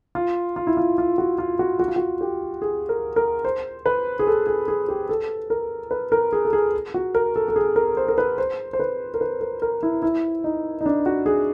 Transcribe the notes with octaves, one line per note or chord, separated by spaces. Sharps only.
F4
F4
E4
F4
F4
F#4
F4
F#4
F#4
F4
F#4
G4
G#4
A#4
A#4
C5
B4
G#4
A4
G#4
G#4
G4
A4
A#4
B4
A#4
G#4
A4
G#4
F#4
A#4
A4
A4
G#4
A#4
C5
A#4
B4
C5
C5
B4
A#4
B4
A#4
A#4
E4
E4
D#4
D#4
D4
F#4
G#4